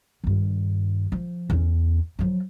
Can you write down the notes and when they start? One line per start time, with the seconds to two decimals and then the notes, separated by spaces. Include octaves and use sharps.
0.24 G2 D#3
1.12 F3
1.50 E2 C#4
2.19 F3 F#3